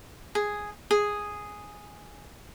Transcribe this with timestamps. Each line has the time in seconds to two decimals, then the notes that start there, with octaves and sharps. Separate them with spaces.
0.35 G#4
0.91 G#4